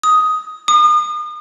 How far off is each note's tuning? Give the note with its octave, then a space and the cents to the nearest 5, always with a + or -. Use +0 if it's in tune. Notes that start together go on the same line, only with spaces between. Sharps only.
D#6 +10
D#6 -40